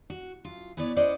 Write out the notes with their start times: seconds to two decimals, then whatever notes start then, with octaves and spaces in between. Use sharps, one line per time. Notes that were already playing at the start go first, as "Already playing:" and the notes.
0.10 F#4
0.45 F#2 F4
0.77 E3 B3 B4 C#5 D5
0.96 C#4 E4 C5 D5 D#5 F#5